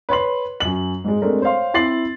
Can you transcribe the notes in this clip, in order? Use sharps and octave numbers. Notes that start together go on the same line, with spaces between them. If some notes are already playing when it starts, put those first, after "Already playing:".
B4 C#5 C6 F#7
F#2 F#7
G#2 G#3
G#3 A3 C4 D4 A#4
C5 C#5 F5 C6
C4 E4 C6 A6 C7 F#7